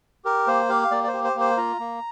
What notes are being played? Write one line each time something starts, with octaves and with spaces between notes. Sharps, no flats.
G4 A#4
A#3 C5
G4 F5
A#3 D5
D5
C5
G4
C5
A#3 C5
F4 A#5
A#3